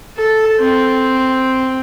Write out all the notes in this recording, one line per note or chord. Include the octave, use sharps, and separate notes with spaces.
A4
C4